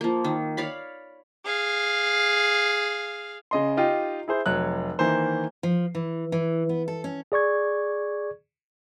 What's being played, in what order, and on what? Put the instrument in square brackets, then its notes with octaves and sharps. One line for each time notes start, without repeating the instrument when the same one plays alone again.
[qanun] F3 A#3
D#3
C#5 D5 F5 B5
[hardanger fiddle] G#4 F5
[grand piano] C#3 D#5 C6
D#4 F4 G4 D#5
E4 G#4 C5
F1 F#3 F#6
D#3 E3 A#3 C5
[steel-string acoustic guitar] F3
E3
E3
B3
A4
C#4
[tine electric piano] G#4 D5 C#6 G#6